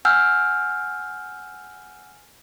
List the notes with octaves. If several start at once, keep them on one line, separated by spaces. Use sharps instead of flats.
F#5 G#5 E6 F6 G6